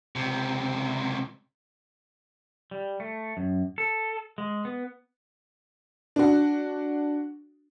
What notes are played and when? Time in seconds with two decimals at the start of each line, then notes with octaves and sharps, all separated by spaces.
0.16 C#2 C3
2.71 G3
3.00 A3
3.37 F#2
3.78 A4
4.38 G#3
4.65 B3
6.16 D4 F#4